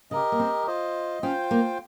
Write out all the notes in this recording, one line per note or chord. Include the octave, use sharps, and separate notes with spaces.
C#3 G4 A#4 D#5
A#3
C4
F4 C5 D#5
C#4 F4 C5 G5
A#3